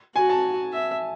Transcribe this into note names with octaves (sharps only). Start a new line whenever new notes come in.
F#4 G#5
A5
E5